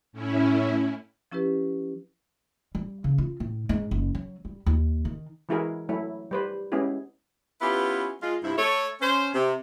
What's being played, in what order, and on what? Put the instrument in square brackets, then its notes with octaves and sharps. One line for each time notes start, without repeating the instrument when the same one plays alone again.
[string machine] A2 C#4 E4
[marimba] F3 C#4 E4 G4 B4
[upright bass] G3
C#3
F4
A2
G#2
F#1
F#3
G3
D#2
D#3
[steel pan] E3 G#3 E4 F#4 G#4 A#4
F#3 A3 E4
G3 B4 C5
G#3 B3 C#4 E4 G4 G#4
[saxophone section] B3 C#4 E4 F4 G4 B4
G#3 F4
G2 C3 F3 E4
A3 A4 C#5
C#4 C5
C3